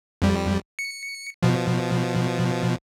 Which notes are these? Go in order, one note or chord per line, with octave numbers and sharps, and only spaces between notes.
F2 G3
C#7
B2 F3